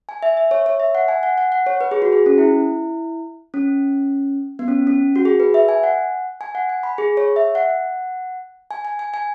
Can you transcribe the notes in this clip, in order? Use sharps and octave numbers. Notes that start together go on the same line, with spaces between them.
G#5
E5
E5
C#5
C#5
E5
F#5
G#5
F#5
F#5
F#5
C#5
B4
G#4
F#4
G#4
C#4
E4
C#4
B3
C#4
C#4
F#4
G#4
B4
E5
G#5
F#5
G#5
F#5
G#5
B5
G#4
C#5
E5
F#5
G#5
G#5
G#5
G#5